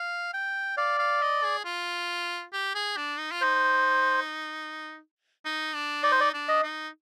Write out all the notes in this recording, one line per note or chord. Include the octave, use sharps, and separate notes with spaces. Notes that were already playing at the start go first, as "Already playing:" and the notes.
Already playing: F5
G5
D5 F5
F5
D#5
G#4
F4
G4
G#4
D4
D#4
F4
D#4 C5
D#4
D4
D#4 D5
C5
D5
D4
D#5
D#4